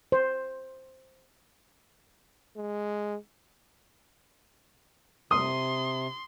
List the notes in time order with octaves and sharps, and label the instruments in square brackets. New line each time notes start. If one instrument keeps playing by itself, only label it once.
[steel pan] C5
[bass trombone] G#3
[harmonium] C3 [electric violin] C6 [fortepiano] D#6